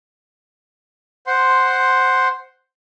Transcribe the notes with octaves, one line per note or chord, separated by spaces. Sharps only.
C5 F#5 C6